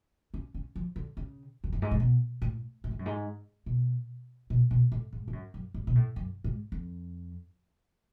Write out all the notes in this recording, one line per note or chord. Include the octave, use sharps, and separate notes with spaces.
C#4
C#4
F3
D3
C#3
F2
F#2
G#2
A2
B2
A2
A2
G#2
F#2
G#2
B2
B2
B2
A2
G#2
G#2
F#2
F#2
G#2
B2
A2
F#2
G#2
F2